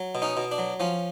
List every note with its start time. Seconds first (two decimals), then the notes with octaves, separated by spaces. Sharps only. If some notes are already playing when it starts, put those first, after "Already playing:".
Already playing: F#3
0.15 B2
0.22 C#4 D#4
0.37 B2
0.52 D4
0.58 F#3
0.80 F3 C#4